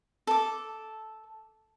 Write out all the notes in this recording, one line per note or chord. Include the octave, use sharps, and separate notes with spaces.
A4 D6